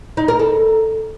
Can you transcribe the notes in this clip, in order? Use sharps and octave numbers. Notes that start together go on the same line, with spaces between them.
D#4
A#4
A4